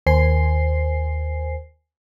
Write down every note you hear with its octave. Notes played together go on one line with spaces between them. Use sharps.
D#2 C5 G#5 C7